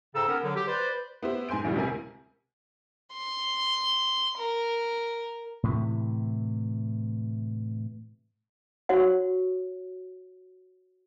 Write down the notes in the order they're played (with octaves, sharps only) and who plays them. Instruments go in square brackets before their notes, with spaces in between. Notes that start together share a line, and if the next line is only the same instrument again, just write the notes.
[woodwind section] G#2 C#3 A4 G5 A#5 E6
B3 C#4 A#4
D3 F#3
G4
B4 C5 D5
[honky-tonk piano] B3 E4 G4 C5
G#2 G#5 C6 G6 D7
A1 D2 A2 G3
C#2 C3 A#4 G#5
[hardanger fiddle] C6
A#4
[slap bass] A2 C3 E3
[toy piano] F#4 C#5 F#5